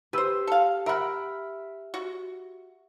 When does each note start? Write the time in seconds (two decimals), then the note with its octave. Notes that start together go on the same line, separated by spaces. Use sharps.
0.13 G4 B4 C5 E6
0.47 A4 F5
0.86 A#4 E5 F#5 B5 F6
1.94 F#4